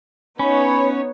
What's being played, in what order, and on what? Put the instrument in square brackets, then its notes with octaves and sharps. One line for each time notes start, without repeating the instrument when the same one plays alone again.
[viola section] B3 D#4 C#5 [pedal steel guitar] C#4 [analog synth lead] B5